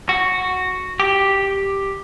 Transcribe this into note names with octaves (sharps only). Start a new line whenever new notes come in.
F#4
G4